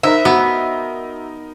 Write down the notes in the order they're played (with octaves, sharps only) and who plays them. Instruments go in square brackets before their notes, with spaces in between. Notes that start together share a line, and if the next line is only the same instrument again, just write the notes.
[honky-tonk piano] D#4 A#4 [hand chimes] C5 B5 [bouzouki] E5
[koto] B3 [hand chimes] F#4